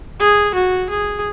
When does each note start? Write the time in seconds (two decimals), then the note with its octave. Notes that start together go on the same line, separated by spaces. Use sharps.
0.19 G#4
0.55 F#4
0.90 G#4